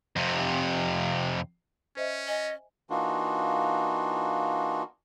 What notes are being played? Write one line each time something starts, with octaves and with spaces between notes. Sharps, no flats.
F2 C3
C#4 C5 D#5 E5
D#5 G#5
E3 A#3 D4 D#4 F4 F#4